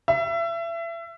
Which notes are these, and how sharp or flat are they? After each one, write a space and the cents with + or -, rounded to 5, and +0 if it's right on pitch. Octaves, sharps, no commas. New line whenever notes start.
E5 +30